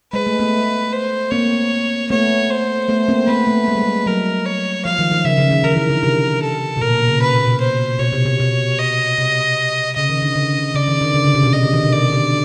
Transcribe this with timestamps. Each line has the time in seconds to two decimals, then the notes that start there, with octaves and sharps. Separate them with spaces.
0.13 G#3 B4
0.27 A3
0.39 A3 B3
0.93 C5
1.31 A#3 C4 C#5
2.10 A3 B3 C#5
2.50 C5
2.89 A3 B3
3.08 A#3 C4
3.27 A3 B3 B4
3.47 A3
3.68 G#3
3.75 G3
3.83 G#3
4.06 F#3 A#4
4.46 C#5
4.85 F3 F5
4.99 D#3
5.11 D#3
5.25 C#3 E5
5.38 C#3
5.51 D#3
5.64 D#3 A#4
5.73 E3
5.77 D#3
5.90 D3
6.03 C3
6.42 A4
6.77 B2
6.81 A#2 A#4
6.94 B2
7.08 C#3
7.21 B2 B4
7.34 A#2
7.47 B2
7.61 C5
7.99 B2 C#5
8.13 C3
8.25 C3
8.40 B2
8.79 D#5
9.18 C3
9.96 C#3 D#5
10.10 D#3
10.22 D3
10.36 C#3
10.75 C#3 D5
10.88 D#3
11.01 D3
11.14 C#3
11.25 C#3
11.34 C3
11.43 B2
11.53 C3 D#5
11.63 D3
11.73 D#3
11.83 B2
11.92 C3 D5
12.13 D3